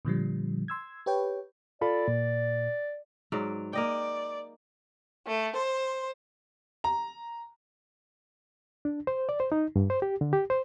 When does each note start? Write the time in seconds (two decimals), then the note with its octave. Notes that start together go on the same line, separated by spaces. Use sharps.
0.05 A#2 D3 F3 G3
0.68 C6 E6 G#6
1.06 G4 B4 C#5 G5
1.81 F4 A4 D5 B5
2.08 A#2
3.32 G#2 F#3 D5
3.73 A#3 D5 D#5 G5
5.26 A3
5.56 C5
6.84 A#5
8.85 D4
9.07 C5
9.29 D5
9.40 C5
9.52 D#4
9.76 G2
9.90 C5
10.02 G4
10.21 D3
10.33 G4
10.50 C5